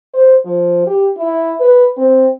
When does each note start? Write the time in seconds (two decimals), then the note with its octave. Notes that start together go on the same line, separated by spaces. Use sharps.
0.14 C5
0.45 F3
0.87 G4
1.17 E4
1.60 B4
1.98 C4